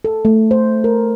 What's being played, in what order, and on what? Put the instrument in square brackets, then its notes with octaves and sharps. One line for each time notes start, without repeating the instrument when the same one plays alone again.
[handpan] A4
A3
C5
A#4